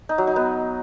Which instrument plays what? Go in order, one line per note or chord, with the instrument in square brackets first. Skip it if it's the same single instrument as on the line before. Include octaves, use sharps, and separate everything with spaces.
[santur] D#4
F#3
D#4
B3